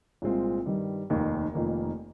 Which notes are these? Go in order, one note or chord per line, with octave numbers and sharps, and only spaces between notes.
C2 A#2 G#3 C4 F4
G2 D#3 G3
F1 D#2 D#3
F1 F2 D#3 A#3